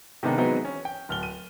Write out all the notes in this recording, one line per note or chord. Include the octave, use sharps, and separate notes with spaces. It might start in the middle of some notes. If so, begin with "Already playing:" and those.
C3 D#3 G#3 B3 D4 D#4
E3 F#3 G#3 B3 C4 D#4
C#4
G5
D1 F6 G7
D#7